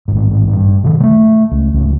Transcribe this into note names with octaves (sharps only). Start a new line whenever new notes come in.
A1 G#2
G2
C3 D#3
G3 A3
C#2
D1 C#2